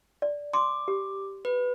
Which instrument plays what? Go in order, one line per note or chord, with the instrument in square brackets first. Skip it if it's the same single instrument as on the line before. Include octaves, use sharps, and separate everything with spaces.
[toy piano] D5
[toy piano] C6 [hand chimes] D6
[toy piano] G4
[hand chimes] B4